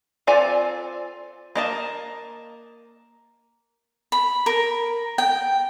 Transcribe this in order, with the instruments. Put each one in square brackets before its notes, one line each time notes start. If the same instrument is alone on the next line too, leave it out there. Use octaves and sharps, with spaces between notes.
[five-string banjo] C4 F4 A4 D5 G#5
A#3 D#5 A5
[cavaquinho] B5
A#4
G5